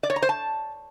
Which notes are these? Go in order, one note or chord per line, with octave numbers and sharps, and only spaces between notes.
D5
C#5
A#5
C5
A5